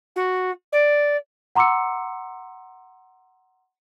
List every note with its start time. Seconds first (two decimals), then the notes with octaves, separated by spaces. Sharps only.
0.16 F#4
0.72 D5
1.55 F#5 A#5 C6 D6 E6 C#7